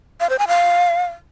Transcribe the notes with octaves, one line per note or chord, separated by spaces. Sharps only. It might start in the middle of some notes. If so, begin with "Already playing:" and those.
F5
C5
G#5
F5